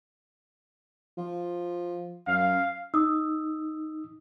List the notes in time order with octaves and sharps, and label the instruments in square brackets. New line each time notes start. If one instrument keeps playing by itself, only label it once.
[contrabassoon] F3
[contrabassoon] F#2 [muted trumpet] F5
[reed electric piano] D#4 [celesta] D#6 E6